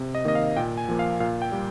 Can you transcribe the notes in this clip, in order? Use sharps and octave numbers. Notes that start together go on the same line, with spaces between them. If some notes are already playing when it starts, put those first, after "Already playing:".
Already playing: C3
D#5
D#3 A#3 D#5
F5
A#2 G5
G#5
F3 A#3
F5
A#2 F5
G5
G3 A#3